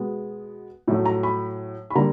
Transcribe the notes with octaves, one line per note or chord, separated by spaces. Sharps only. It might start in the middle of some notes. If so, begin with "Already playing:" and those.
Already playing: B2 G#3 B3
A2 F#3 A3
A#5
B5
B5
D3 G3 A#3 A#5